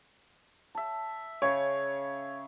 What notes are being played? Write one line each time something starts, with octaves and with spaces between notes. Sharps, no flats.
E5 A5
C#3 C#5